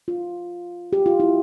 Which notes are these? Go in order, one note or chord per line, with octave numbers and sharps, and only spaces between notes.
F4
G4
F4
E4